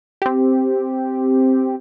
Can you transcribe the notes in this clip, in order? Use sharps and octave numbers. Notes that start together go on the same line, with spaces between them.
C4 G4